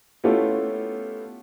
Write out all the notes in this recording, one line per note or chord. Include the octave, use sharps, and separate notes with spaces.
A3 B3 C#4 E4 F4 G4